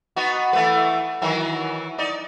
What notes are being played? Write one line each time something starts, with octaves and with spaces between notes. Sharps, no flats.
B3 D#4 F#4
E3 A3 B4
D#3 E3 F#3
D#4 D5